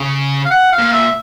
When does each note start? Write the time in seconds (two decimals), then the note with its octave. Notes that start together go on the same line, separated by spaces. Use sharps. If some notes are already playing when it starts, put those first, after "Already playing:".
Already playing: C#3
0.45 F5
0.50 F#5
0.72 F5
0.79 A#2
0.93 E5